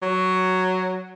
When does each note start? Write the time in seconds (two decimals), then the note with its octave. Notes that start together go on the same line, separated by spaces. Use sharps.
0.02 F#3